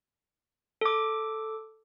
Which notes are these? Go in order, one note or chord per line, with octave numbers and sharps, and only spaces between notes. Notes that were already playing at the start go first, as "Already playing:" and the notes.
A4 D6